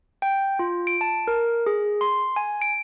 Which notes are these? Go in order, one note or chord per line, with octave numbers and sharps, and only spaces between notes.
G5
F4
D7
A5
A#4
G#4
C6
G#5
D7